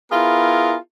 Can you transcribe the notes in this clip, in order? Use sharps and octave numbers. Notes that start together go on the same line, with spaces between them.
B3 E4 F4 G#4 A#4